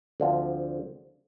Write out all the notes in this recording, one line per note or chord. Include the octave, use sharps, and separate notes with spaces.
D2 D3 F3 C4